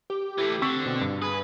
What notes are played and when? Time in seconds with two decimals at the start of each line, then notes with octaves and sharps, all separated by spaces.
0.10 G4
0.38 E3 A3 E4
0.62 D3 C4 C#6 E6 B6
0.86 B2
1.01 G2
1.22 G#4 B4